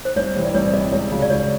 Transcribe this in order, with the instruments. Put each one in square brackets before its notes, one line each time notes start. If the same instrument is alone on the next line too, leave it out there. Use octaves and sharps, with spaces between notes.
[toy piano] C5
[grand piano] C2 [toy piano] C#5
[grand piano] C3 E3 G3
[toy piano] D5
[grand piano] C2 [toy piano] C#5
[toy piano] D5
[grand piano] C3 E3 G3 [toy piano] D#5
[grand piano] C#2 [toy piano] C#5
[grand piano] C#3 F#3
[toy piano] D5
[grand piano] C#2 [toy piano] C#5